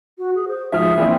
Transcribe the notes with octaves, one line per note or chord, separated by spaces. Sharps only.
F#4
G#4
C5
G#2 F3 G#4 E5 F6
E3 A#3 C4 D4